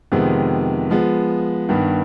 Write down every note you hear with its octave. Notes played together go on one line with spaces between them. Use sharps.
F2 C3 D#3 G#3 B3
F3 G#3 B3
G2 D#3 B3